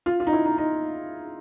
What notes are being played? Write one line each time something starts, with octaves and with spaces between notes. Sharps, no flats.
F4
F4
D#4
E4
D#4
D#4